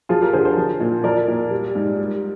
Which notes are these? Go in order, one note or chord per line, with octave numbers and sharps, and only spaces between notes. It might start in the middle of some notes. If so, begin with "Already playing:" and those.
F3 F4 G#4
G4 A#4
D3 G#4 C5
G#4 C5
F3
A#2
F3 A#4 D5
A#2
G3
G#2
G3